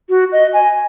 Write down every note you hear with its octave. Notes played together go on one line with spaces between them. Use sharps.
F#4
D#5
G#5